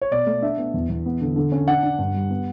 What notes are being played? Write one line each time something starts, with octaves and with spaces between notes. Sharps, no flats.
C#5
B2 D5
A3
D4 E5
B3
E2
E2
B3
D3
D3
C#4
D4 F#5
D4
G2
G3
B3